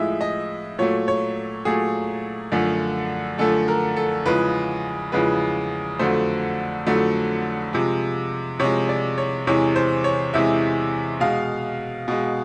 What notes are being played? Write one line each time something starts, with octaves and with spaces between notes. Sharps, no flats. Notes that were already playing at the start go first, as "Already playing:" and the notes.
Already playing: A2 F3 G#3 E5 F5
D#5
A#2 F#3 A3 C#5
C#5
A#2 F#3 A3 G#4
F#2 D3 F3 A3
F#2 D3 F3 A3 A4
A#4
A4
E2 C#3 F3 G#3 B4
E2 C#3 F3 G#3 B4
F2 D3 F#3 A3 C5
F2 D3 F#3 A3
C3 F3 G#3
C3 F3 G#3 C#5
D5
C#5
E2 C3 E3 G#3 C#5
C5
C#5
E2 C3 E3 G#3 E5
B2 G#3 F5
B2 G#3